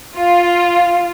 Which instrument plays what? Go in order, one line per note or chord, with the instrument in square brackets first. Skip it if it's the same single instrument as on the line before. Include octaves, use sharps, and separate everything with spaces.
[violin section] F4 [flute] F5